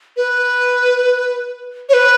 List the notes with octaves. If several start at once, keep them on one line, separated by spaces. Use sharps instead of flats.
B4
C#5
B4